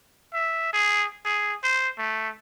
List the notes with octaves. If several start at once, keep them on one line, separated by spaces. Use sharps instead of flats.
E5
G#4
G#4
C5
A3